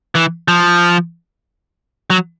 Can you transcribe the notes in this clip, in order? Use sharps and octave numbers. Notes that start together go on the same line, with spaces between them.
E3
F3
F#3